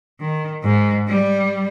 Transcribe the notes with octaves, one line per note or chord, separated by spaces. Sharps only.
D#3
G#2
G3